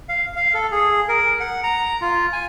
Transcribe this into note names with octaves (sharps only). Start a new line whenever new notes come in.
F5
F5
A4
G#4
A#4
F#5
A#5
F4
G#5